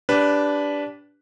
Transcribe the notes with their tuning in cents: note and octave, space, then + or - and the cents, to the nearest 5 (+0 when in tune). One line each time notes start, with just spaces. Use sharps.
D4 -15 G4 +0 B4 +0